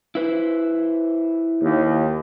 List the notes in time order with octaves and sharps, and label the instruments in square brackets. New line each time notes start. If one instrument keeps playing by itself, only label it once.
[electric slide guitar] E4 B4 C5
[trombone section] D#2